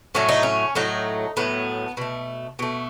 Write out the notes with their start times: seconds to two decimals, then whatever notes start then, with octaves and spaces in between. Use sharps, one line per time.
0.15 A2 F#3 A3 C#4
0.29 D#4
0.43 C#4
0.75 A2 F#3 A3 D#4
1.37 A2 F#3 A3 B3
1.97 B2 A3
2.59 B2 A3